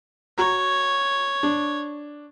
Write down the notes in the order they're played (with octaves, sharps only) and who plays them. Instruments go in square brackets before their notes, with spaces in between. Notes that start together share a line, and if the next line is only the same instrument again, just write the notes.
[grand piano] F#4 A#5 [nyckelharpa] C#5
[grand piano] D4